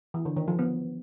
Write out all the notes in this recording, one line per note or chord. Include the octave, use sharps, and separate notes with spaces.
E3
D3
D#3
F3
B3